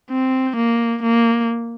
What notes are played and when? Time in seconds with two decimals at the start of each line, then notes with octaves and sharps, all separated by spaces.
0.10 C4
0.56 A#3
1.03 A#3